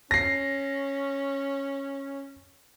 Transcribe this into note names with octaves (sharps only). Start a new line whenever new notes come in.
C#4 A#6 C7